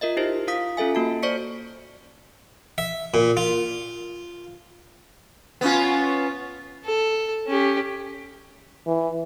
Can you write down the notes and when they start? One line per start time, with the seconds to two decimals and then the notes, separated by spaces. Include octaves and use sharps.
0.01 F4 A#4 D#5 E5
0.17 D#4 E4 G4 C5
0.48 F4 F5 D#6 B6
0.77 C#4 F4 A4 E5 G#5
0.95 A#3 F#4 A5
1.22 C5 D5 C#6 B6 C#7
2.78 E5
3.14 A#2
3.37 F4
5.61 B3 C#4 F4
6.86 A4
7.48 C#4 G4
8.87 E3